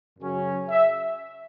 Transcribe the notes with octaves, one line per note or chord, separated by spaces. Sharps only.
F#2 C#3 F#3 C#4
E5